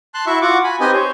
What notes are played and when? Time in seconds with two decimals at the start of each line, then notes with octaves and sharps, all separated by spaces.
0.14 A5 C6 F#6
0.27 E4 F#4 E5 C#6
0.42 F4 F#4 F#5 C#6 D6
0.64 G#5 B5
0.80 C4 D#4 G4 B4 D#5 G#5
0.93 C5 C#5